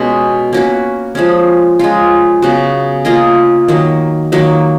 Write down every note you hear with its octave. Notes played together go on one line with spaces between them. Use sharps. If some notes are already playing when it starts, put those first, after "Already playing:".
Already playing: B2 G#3 C#4
A#3 C#4 F#4 B4
F3 G#3 C#4
G#3 C#4 F4
C#3 F#3 B3 F#4
A#3 F4 G#4 D#5
D#3 F#3 A#3
D#3 F#3 A#3